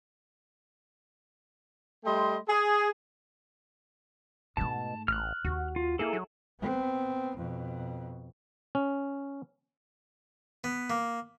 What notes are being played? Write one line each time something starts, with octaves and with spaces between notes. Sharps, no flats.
G3 A3 D#5 G5 C6
G#4
G#2 B2 A3 A5
A1 F6 F#6
D#2 F#4
F4
A#3 E4 G#4 A4
F#3
B3 C4
F2 B2
C#4
B3
A#3